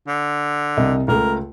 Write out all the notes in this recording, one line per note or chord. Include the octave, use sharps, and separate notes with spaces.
D3
C2 D#5
C#2 A3 A#4